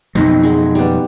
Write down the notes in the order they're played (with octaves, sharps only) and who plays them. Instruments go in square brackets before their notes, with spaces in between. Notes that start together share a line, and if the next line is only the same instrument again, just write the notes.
[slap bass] F2 B2 F#3 [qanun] C4 D#4
[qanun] G#3 F#4 G#4
G3 B3